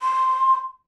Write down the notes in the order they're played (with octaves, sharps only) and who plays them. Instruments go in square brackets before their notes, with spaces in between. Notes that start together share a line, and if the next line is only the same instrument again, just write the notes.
[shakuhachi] C6